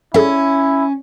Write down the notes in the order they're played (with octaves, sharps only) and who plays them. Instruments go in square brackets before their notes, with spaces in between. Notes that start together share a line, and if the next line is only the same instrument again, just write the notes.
[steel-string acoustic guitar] C#4 [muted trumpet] E4 [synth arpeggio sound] G#4 A4 E5